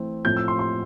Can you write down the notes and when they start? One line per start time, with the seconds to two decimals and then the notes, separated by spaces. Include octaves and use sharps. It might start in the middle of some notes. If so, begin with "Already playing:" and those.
Already playing: E3 A3 C4
0.25 A2 F3 C4 G6
0.37 E6
0.48 C6
0.59 C6